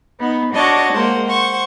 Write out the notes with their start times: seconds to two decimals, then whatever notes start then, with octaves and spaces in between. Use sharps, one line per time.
0.19 B3 D#4
0.53 D4 F#4 C#5 D#5 A5
0.92 G#3 A#3 C5 F#5
1.26 C5 F#5 C#6